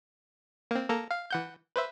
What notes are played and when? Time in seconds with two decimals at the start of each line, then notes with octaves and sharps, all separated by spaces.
0.71 A#3 C4
0.89 A#3 A4 A#5
1.11 F5
1.30 E3 F#5 G6
1.76 B4 C5 E5